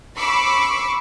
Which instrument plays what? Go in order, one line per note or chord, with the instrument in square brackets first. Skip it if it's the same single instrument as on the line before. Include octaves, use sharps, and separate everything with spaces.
[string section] B5 C#6 D6 E6 C7